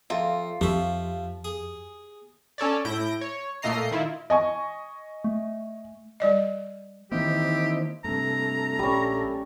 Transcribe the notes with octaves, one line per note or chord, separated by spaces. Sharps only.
F2 F4 E5
F2 F3 G4 E5
G#4
C#4 A4 C#5 D5
A2 E4 G6 A#6 D7
C#5
A#2 A3 A#3 D#5 A#5 C7
D#3 E4 F4
D#5 G#5 C#6
A3
G3 D5 D#5
D#3 E3 A#3 C4 D#4 E4 G4
G2 C3 A3 A#5
A#1 G3 C#4